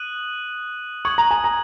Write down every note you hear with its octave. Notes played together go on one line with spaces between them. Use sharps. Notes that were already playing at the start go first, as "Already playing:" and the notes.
Already playing: D#6 F#6 D#7 F#7
C#6 D#6 G#6 F#7
A#5
G#5
A#5